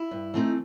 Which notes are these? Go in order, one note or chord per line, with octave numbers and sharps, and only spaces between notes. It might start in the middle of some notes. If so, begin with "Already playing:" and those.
Already playing: E4
G2
E3 A3 C4 D#4